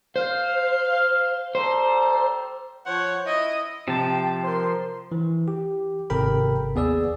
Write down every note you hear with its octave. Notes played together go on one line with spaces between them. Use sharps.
C5 F5
G3 A4 C5 A#5
F3 C5 C#5 F#5
E4 D#5
C3 F3 G5 A5
A#4 C5 C6
E3
G4
G#1 C3 A4 A#4 G5 B5
D#2 B3 G#4 D5 E6